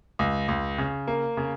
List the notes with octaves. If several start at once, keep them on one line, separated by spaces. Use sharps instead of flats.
C#2
C#2
C#3
A#3
C#3